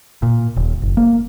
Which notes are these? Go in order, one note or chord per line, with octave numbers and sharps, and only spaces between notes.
A#2
D#1
F#1
A#3